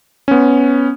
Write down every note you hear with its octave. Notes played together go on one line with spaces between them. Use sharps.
B3 C#4